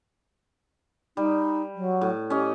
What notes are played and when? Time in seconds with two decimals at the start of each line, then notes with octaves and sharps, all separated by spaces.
1.17 G3 D#4
1.74 F#3
2.01 A2
2.30 C#4 G4 D#5